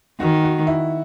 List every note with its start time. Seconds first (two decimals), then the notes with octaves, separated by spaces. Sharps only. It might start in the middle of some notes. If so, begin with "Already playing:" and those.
0.20 D#3 F#4
0.44 F#4
0.67 E4